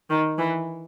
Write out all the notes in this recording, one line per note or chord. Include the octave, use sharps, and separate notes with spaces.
D#3
E3